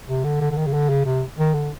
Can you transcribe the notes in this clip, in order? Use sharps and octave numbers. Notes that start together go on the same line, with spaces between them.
C3
D3
D3
D3
D#3
C#3
D3
C#3
C3
D#3
D3